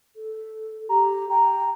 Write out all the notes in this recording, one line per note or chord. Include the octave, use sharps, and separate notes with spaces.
A4
G4 A#5
G5 A#5